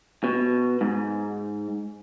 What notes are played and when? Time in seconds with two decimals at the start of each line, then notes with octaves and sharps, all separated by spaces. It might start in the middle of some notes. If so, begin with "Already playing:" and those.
0.24 B2
0.81 G#2